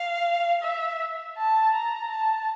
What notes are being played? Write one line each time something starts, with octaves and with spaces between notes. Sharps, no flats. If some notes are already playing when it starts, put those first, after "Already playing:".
Already playing: F5
E5
A5
A#5
A5